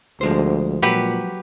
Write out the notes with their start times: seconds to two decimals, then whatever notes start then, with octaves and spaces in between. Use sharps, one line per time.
0.21 D2 F3 G#3 C5
0.82 A#2 F#3 G4 B4